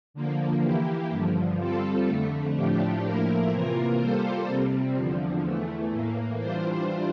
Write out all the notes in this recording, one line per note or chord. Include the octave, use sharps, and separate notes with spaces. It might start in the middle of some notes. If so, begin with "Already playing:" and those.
D3 F3 A#3
E3 A#3 E4 G4
G2 D3 F3
G3 C4 F4 A4
F2 D3 A3
A2 F3 A3 D4 G4
A2 F3 A#3 E4 A#4
C3 E3 A#3 F4 A#4
G3 A#3 F4 A4 C5
C3 G3 C4
E2 D3 F3
E2 E3 A3
A2 E3 A#3
E3 G3 D4 F4 C5